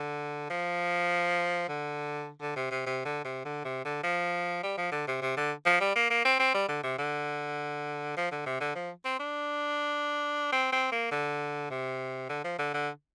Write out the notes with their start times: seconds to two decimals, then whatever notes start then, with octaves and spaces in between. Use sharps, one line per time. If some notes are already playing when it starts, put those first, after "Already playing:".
Already playing: D3
0.50 F3
1.68 D3
2.41 D3
2.56 C3
2.71 C3
2.86 C3
3.05 D3
3.24 C3
3.45 D3
3.64 C3
3.85 D3
4.03 F3
4.63 G3
4.77 F3
4.92 D3
5.07 C3
5.21 C3
5.37 D3
5.66 F3
5.80 G3
5.96 A#3
6.10 A#3
6.25 C4
6.39 C4
6.54 G3
6.68 D3
6.83 C3
6.98 D3
8.17 F3
8.31 D3
8.46 C3
8.60 D3
8.75 F3
9.05 C4
9.20 D4
10.52 C4
10.72 C4
10.92 A#3
11.11 D3
11.70 C3
12.29 D3
12.44 F3
12.58 D3
12.74 D3